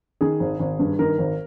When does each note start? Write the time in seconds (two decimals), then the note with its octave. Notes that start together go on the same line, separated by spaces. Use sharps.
0.21 D#3 G#4
0.40 G#1
0.59 G#1
0.79 G2
0.99 D#3 A#4
1.18 G#1